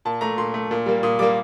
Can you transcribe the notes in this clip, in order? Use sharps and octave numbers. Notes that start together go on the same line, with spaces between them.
A#2 A5
A3 A#5
A#2 C6
A3
A#2
G3 A#3
A#2 D#6
G3 A#3 D6